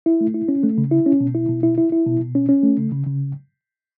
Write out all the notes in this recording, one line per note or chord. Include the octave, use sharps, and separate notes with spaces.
E4
A3
E4
C#4
A3
C#3
E4
C#4
B2
E4
B2
E4
E4
E4
B2
B2
C#4
C#4
A3
C#3
C#3
C#3